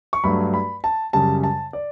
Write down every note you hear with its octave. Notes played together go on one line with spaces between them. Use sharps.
C#6
G2 F#3 A3 B5
B5
A5
F#2 C#3 G3 A5
A5
D5